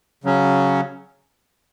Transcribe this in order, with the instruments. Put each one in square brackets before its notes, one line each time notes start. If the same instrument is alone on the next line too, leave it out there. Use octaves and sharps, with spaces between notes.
[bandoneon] C#3 F#3 C#4